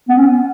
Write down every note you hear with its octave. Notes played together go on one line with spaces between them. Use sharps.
B3
C#4